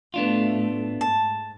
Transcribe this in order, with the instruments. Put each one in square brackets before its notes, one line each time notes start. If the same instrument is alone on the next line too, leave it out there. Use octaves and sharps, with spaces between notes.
[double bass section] A2 A3 [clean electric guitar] B3 D4 F4
[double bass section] G#2 [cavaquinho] A5